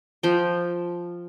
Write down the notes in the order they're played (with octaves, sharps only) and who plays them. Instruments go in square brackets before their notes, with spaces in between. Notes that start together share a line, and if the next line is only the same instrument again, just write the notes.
[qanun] F3 G5